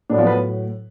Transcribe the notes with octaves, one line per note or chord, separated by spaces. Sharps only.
A2 F#3 B3 D4
F3 F4
B3 B4